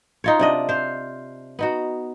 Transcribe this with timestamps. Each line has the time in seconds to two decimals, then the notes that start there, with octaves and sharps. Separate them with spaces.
0.24 D#4 F4 C#5
0.39 C3 D4 D#5
0.69 C5 F5
1.59 B3 D#4 F#4